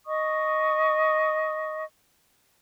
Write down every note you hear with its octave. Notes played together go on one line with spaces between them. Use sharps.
D#5 C#6 D#6